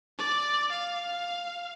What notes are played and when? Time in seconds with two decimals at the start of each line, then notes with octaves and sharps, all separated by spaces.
0.18 D5
0.71 F5